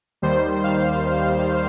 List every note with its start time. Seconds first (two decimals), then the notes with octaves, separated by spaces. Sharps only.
0.22 D#2 D#3 G3 C5
0.64 F5